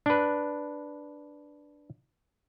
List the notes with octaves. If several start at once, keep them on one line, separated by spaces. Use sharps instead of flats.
D4 B4